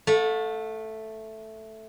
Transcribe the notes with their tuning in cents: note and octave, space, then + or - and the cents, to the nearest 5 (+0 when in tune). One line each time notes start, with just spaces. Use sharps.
A3 +0 F5 +45